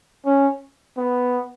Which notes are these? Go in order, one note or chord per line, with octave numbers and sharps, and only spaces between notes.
C#4
B3